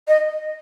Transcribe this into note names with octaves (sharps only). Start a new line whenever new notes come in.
D#5